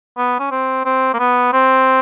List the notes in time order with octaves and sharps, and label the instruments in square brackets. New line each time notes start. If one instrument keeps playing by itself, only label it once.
[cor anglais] B3
C#4
C4
C4
A#3
B3
C4